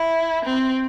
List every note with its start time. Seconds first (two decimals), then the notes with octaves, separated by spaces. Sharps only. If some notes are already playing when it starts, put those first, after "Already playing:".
Already playing: E4
0.46 C4